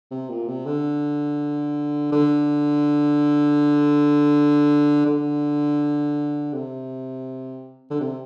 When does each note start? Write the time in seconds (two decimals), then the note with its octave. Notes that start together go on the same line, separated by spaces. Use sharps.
0.11 C3
0.30 A#2
0.48 C3
0.66 D3
2.13 D3
5.06 D3
6.53 C3
7.90 D3
8.01 C3